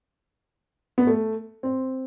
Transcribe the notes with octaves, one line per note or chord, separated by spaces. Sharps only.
B3
A3
C4